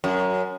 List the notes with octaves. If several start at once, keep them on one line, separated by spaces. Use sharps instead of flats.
F#2